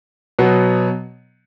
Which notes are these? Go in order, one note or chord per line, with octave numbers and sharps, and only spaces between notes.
B2 F#3 B3